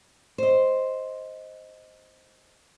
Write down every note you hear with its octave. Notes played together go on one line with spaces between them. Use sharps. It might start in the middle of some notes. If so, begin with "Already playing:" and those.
C5 D#5